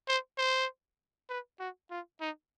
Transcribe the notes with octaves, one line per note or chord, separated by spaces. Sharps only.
C5
C5
B4
F#4
F4
D#4